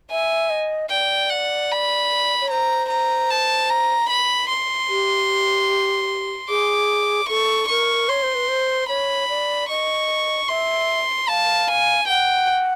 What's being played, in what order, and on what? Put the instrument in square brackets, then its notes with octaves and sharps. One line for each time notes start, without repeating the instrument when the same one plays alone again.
[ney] E5 [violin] G#5
[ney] D#5
[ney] D5 [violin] G5
[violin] F#5
B5
[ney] C#5
[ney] C5 [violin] A#5
[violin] A#5
A5
A#5
B5
C6
[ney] G4
[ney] G#4 [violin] D6
[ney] A4 [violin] C#6
[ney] A#4 [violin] C#6
[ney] C#5 [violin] C6
[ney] C5
B4
C5
[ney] C#5 [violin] B5
[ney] D5
[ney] D#5 [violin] C#6
[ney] E5 [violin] C6
[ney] F5 [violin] A5
[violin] G#5
[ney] F#5 [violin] G5